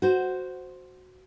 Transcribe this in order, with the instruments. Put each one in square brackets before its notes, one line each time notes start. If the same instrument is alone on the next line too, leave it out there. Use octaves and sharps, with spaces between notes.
[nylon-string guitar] F#4 C5